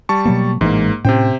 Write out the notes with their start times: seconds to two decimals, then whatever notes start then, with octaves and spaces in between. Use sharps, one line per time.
0.09 G3 A5 C#6
0.25 B2 F#3 A#3
0.61 A1 G#2 E3 G#3 A#3
1.05 A2 C3 C#4 C5 G5